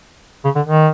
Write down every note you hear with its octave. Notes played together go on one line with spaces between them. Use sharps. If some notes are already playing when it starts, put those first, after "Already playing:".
C#3
D3
D#3